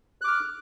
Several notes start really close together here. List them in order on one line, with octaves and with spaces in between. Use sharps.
F#6 D6 F6